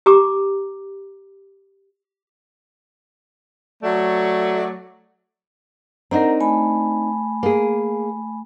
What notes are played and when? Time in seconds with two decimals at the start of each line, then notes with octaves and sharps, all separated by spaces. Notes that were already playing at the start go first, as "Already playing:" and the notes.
0.06 G4 A#5 D6
3.83 F#3 A3 D5
6.11 C4 D4 D#4 A#4 F#5 A#5
6.40 A3 G#5 B5
7.43 A#3 G#4